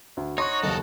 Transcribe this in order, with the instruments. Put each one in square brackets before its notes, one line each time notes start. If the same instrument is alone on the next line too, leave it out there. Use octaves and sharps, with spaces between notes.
[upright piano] D2
[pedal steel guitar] D#4 F#4 [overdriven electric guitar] C#5 [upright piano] C6 C#6
[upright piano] F#1 D#2 [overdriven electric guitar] A4 A#4